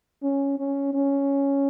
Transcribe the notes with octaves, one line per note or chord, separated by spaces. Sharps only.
C#4
C#4
C#4